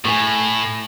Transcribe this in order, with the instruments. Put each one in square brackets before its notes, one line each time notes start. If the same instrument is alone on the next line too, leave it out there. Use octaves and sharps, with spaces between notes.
[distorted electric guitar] A2 [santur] G#5 C#6